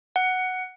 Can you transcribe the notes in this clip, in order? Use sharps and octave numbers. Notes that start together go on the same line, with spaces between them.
F#5